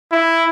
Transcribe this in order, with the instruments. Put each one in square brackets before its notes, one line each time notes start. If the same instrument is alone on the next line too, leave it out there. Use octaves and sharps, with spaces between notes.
[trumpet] E4